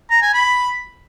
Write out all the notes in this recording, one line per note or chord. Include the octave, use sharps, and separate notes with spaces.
A#5
G#5
B5